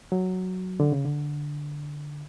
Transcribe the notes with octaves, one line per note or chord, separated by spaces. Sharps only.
F#3
D3
C#3
D3